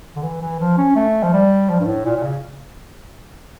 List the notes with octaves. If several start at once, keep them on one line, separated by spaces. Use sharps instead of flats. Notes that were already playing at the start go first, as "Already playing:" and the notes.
D3
E3
E3
F3
C#4
A3
F3
G3
F3
G2
A2
A#2
A#2
C#3